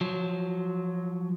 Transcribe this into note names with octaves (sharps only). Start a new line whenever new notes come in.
F3 F#3